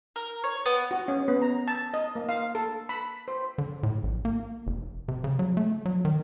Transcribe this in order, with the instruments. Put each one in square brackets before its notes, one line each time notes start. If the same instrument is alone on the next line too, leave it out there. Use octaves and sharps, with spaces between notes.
[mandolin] A#4
C#5
B3
[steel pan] F#4
C#4
B3
A#5
A5
D#5
A#3
F5
A4
B5
C5
[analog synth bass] D3
A2
A#1
A#3
F1
C3
C#3
F#3
A3
F#3
D#3